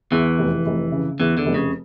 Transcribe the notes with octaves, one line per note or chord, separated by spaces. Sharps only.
E2 E3
F1
F1
C#3
E2 E3
D3
F1
C#3